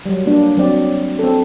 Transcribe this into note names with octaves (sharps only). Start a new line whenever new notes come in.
F#3 G3
A#3 D4
F#3 C4 D5
C4 A4